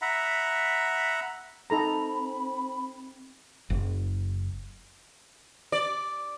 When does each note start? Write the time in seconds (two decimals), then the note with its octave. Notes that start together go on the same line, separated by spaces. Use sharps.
0.02 E5 F#5 A#5 B5
1.70 C4 D#4 A4 A#5 B5
3.70 F#1
5.72 D5